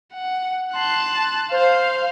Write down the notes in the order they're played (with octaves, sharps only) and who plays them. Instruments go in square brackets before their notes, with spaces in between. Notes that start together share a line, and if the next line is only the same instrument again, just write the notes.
[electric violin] F#5
[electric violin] A5 F#6 [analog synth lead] C6
[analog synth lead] C5 [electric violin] F5